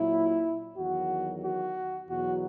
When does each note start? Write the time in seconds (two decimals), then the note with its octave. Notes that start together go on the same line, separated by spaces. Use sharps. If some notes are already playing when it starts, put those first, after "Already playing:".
Already playing: A#2 F#3 E4
0.77 E2 D#3 F#3 F#4
1.43 F#4
2.09 E2 B2 F#3 F#4